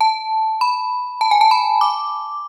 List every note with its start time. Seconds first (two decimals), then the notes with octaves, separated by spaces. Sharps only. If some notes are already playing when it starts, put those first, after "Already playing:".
0.01 A5
0.61 B5
1.21 A5
1.31 G#5
1.41 A5
1.51 B5
1.81 D6